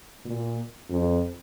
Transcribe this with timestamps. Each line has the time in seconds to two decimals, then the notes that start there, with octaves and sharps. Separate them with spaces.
0.25 A#2
0.90 F2